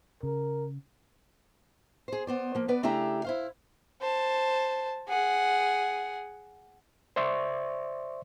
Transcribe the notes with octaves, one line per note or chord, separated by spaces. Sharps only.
C#3 A#4
G#4 C5
B3 C5 D5
F3 A#3
B3 B4 D5
C#3 A3 D4 E4 G4 A#5
E4 C5 F5
C5 A5
G#4 F#5
C5 D5 E5 C6 C#6